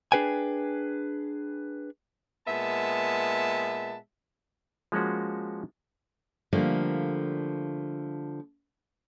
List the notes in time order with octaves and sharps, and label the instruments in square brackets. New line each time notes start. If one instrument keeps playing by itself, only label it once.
[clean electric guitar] D4 G#4 B4 G5 G#5
[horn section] A#2 G#3 B3 E5 A5
[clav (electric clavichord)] F3 G#3 A#3 C#4 F#4
[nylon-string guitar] D3 F3 G3 A3 A#3